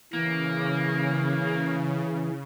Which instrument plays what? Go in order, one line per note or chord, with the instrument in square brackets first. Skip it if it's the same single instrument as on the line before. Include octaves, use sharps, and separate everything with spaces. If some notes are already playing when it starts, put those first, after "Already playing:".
[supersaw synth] C#3 [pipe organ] E3 [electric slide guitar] A#3